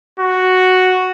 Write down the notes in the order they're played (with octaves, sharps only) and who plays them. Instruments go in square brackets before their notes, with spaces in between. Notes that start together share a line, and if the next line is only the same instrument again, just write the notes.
[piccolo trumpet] F#4